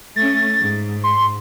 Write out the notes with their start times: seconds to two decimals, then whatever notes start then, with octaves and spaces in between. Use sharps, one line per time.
0.16 A3 C#4 A6
0.60 G#2
1.04 C6